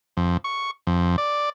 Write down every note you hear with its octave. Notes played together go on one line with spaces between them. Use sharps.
F2
C#6
F2
D5